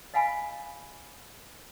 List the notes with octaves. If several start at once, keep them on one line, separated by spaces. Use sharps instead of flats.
D#5 F5 F#5 G#5 B5